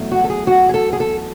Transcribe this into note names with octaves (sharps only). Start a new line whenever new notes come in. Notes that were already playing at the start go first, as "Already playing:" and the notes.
Already playing: E2 B2 F#3 A3
F#4
A4
G#4
F#4
G#4
A4
G#4
A4